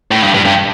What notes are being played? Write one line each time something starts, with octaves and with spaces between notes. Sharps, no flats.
A2
G2
G2
G2